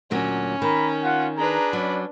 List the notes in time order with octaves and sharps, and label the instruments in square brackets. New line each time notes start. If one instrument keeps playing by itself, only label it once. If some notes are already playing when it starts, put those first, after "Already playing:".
[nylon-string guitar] D2 A#2 F#3 [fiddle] C#4
[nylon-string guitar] D#3 [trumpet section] A#5 B5
[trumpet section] F4 F#5
[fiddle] D4 B4 [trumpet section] G#4 A#5
[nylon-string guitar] F#3 [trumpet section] C#4 D5 B5